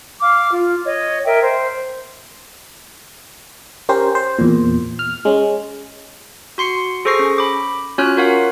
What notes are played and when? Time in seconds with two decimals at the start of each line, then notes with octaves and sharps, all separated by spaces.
0.22 F5 D6 F6
0.52 F4
0.85 C#5 D#5
1.25 A#4 D#5 E5 G5
1.41 C5
3.89 C#4 G4 A#4 C5
4.15 C5
4.39 E2 A#2
4.99 F6
5.25 G#3 C#4
6.58 F#4 C6 C7 C#7
7.05 G#4 A4 C5 C#6 A#6 C7
7.19 C#4
7.38 B5 D6
7.98 C#4 F4 F#4 C#5 F6 F#6
8.17 F4 A#4 C#5 F5 F#5